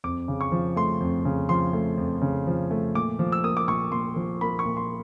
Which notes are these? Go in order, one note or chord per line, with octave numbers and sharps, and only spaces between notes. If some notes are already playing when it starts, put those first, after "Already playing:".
F2 D6
C#3
C#6
F3
A3 C6
F2
C#3
F3 C6
A3
F2
C#3
F3
A3
A#2 D6
F3
E6
A#3 D#6
D6
A#2 C#6
A#2 C6
F3
A#3 B5
C#6
A#2
C6